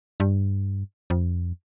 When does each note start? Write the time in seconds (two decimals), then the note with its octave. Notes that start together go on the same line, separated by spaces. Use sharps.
0.20 G2
1.10 F2